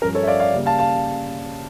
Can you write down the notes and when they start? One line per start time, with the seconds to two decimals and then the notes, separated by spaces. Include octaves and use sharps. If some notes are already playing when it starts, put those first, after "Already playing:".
0.02 G2 F3 C#4 A#4
0.15 A4 C#5
0.23 E5
0.28 D5 F5
0.40 D5 F5
0.54 C#3 G3 A#3 C#4
0.66 F5 A5
0.79 F5 A5